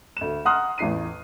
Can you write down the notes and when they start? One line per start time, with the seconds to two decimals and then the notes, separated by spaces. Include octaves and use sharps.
0.17 D2 E7
0.45 F#5 A#5 C6 D#6 F6 F#6
0.78 A1 E2 C7 D#7